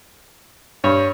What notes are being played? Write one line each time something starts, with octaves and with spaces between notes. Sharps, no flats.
G2 C#5